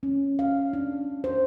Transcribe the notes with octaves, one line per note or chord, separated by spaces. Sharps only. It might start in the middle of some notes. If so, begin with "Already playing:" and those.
C#4
F5
D4
C5